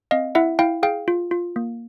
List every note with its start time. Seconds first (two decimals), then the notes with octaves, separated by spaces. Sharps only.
0.11 C4 D#5 F5
0.35 E4 E5 F#5
0.59 E4 F5 G5
0.83 G#4 F5 G5
1.08 F4
1.31 F4
1.56 A#3